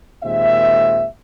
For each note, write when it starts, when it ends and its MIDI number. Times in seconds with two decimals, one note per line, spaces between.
0.24 1.06 39
0.24 1.06 46
0.24 1.06 56
0.24 1.06 60
0.24 1.06 76